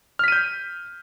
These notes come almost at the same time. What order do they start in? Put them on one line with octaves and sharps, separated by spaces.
F6 B6 D#7 G6